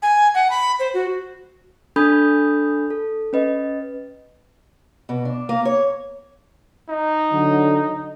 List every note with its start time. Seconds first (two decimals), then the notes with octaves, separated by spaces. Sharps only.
0.02 G#5
0.34 F#5
0.50 B5
0.79 C5
0.94 F#4
1.96 D4 A4 B5 D#6 G6
2.90 A4
3.33 C#4 B4 D#5
5.09 B2
5.25 D4
5.49 A#3
5.65 C#5
6.89 D#4
7.32 D3 F#3